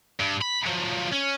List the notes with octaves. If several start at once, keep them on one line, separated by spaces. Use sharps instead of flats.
G2
B5
F3 F#3
C#4